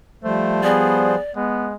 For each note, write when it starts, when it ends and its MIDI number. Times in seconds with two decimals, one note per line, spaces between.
0.24 1.16 53
0.24 1.16 55
0.24 0.61 57
0.24 1.16 72
0.63 1.18 59
0.63 1.20 68
0.63 1.32 74
1.36 1.76 56
1.36 1.70 59